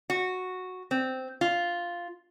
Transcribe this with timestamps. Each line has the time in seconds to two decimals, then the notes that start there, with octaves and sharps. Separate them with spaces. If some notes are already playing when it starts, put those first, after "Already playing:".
0.10 F#4
0.91 C4
1.41 F4